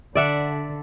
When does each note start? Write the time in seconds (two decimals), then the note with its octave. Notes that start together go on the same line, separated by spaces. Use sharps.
0.15 D3 D5 E5 F#5